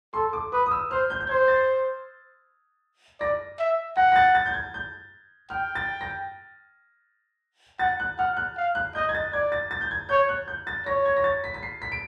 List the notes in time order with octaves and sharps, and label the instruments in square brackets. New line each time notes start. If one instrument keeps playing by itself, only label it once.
[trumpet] A4 [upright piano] C6
[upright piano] D6
[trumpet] B4 [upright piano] D#6
[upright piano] D#6
E6
[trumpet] C5 [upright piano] F6
[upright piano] G6
G6
[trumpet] C5 [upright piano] G#6
[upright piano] A6
[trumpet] D5 [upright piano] A#6
[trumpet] E5
[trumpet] F#5 [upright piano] A#6
[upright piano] A#6
A6
A6
G6
G#6
G6
[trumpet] G5 [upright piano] F6
[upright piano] A6
A#6
[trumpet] F#5 [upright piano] A6
[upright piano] F#6
[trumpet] F#5 [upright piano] F6
[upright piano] F#6
[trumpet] F5
[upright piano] F#6
[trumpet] D#5 [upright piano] G6
[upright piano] G#6
A6
[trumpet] D5 [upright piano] G#6
[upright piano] A6
A6
G6
G#6
[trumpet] C#5 [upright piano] G6
[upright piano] F#6
G6
A6
[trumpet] C#5 [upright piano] A#6
[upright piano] G#6
A#6
A6
B6
B6
C7
B6
D7